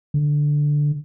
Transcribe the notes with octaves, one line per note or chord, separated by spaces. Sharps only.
D3